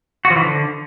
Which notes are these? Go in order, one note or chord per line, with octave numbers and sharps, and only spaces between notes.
F#4
F3
E3
D3